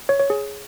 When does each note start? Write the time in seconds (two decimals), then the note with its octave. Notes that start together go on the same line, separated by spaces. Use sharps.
0.09 C#5
0.20 C#5
0.30 G#4